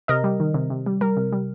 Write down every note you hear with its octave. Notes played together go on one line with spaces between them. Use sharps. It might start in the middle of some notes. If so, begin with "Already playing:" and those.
C3 A#4 D#5
G3
D#3
C3
C3
G3
G3 A#4
C3
G3